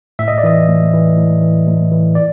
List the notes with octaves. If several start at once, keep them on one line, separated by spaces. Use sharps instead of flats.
A2 E5
D#5
D5
E3 D#5
A2
E3
A2
E3
A2
E3
D5